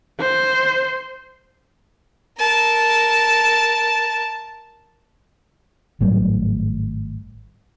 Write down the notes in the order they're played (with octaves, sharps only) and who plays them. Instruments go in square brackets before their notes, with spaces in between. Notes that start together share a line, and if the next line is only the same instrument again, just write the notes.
[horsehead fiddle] C5
[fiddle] A#4 A5
[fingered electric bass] G#1 A2 F#3 G3